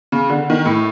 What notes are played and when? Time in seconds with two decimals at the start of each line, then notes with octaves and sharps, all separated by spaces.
0.12 C#3
0.30 D3
0.50 D#3
0.66 A2